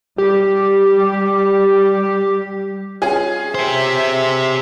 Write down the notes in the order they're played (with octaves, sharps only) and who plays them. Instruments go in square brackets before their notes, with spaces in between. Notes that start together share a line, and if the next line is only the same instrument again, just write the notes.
[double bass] G3 [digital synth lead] G4
[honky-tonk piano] C#4 F4 G#4
[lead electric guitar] G4 C5 [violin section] E5